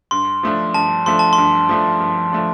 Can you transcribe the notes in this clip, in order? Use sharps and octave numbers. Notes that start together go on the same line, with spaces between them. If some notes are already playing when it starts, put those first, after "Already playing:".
G2 C6
F3 A3 D4
G2 A5
F3 A3 D4 C6
A5
C6
G2
F3 A3 D4
G2
F3 A3 D4